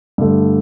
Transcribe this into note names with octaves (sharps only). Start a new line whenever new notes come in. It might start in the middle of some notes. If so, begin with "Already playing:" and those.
G2 D3 A3